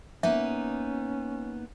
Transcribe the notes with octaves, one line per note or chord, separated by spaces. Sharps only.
A#3 B3 C#4 D#4 E5